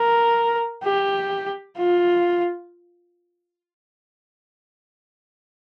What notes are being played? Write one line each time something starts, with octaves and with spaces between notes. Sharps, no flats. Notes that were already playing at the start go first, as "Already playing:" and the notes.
Already playing: A#4
G4
F4